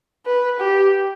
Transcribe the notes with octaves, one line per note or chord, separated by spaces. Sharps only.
B4
G4